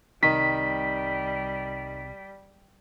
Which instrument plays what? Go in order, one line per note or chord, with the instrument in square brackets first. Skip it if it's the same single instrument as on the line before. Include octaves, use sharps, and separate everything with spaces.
[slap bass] C2 C3 C4 [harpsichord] D#3 [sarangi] G3 [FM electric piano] B6